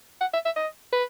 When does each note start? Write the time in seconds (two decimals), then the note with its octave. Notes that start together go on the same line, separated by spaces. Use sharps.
0.21 F#5
0.33 E5
0.45 E5
0.56 D#5
0.92 B4